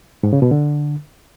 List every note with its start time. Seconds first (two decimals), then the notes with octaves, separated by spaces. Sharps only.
0.23 G#2
0.33 C#3
0.42 B2
0.51 D3